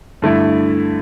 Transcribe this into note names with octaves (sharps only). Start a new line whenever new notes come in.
G2 D3 A3 E4